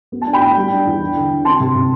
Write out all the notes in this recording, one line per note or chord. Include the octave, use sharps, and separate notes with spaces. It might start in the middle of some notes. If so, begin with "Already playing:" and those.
B3
A5
D4
G5 B5
A2
G3
D4
E2
D4
D3
D3
C4 A5 C6
C3
C3